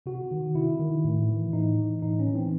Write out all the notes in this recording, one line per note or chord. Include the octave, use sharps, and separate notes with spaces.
C3 F#4
D#3
C3 E4
D#3
A2
E3
A2 D#4
E3
A2 D#4
C#4
E3
C4